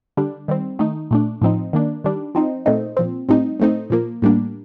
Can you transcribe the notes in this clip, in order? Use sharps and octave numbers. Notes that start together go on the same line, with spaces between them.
D3 G3 D4
D#3 G3 C4
D#3 A3 D#4
A#2 A3 D4
A2 F3 C4 D#4
D#3 A#3 D4
D#3 G3 D4
F3 C4 D#4
A#2 A3 C4 D#4
A#2 F3 C4
A2 G3 C4 D#4
A2 A3 C4 D#4
A#2 F3 A#3
A2 G3 A#3 D4